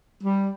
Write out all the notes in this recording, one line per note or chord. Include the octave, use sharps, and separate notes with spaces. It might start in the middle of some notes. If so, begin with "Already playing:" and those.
G3